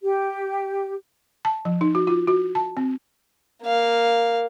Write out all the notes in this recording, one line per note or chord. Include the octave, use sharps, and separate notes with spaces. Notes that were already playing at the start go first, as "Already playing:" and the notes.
G4
A5
F3
D#4
F#4
F4
F#4
A5
C4
A#3 F5